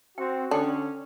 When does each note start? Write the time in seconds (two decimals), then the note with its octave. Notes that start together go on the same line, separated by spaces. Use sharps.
0.18 C4 F#4 G5
0.51 D3 C#4 D4 A4 G5 D6